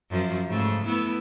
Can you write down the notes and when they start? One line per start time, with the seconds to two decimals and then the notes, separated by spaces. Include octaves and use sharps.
0.11 F#2 F3
0.47 G#2 C#3 A3
0.85 A3 B3 E4